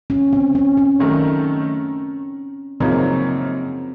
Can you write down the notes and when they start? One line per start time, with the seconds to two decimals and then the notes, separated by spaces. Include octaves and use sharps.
0.10 C#4
0.33 C4
0.55 C#4
0.78 C#4
0.99 F#2 D#3 A3 D#4 A#4
2.80 F#2 C#3 F3 A#3 C4 D#4